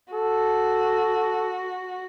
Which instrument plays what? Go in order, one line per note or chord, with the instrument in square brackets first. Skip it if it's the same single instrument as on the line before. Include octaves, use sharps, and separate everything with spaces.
[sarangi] F#4 [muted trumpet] A4